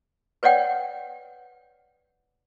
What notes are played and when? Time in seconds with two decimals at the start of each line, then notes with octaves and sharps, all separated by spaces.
0.43 B4 C#5 D5 F#5 G5